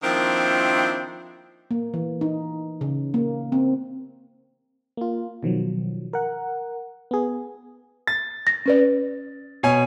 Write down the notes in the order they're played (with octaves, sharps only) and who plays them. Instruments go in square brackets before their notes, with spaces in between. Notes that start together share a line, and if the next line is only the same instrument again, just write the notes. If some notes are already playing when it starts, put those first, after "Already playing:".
[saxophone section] D#3 F3 A#3 C4 D4 E4
[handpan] A#3
E3
D#4
C#3
A#3
C4
[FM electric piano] A#3 F4
B2 D#3 F3 F#3
A#4 F#5
B3 G#4
[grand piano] A6
[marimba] A#6
C#4 B4 D5
[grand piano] B2 C#5 G#5